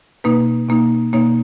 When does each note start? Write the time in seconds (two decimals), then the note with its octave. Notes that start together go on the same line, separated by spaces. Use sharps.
0.24 B2 A#3 D#4 B4
0.69 B2 A#3 D#4
1.13 B2 A#3 D#4 C#5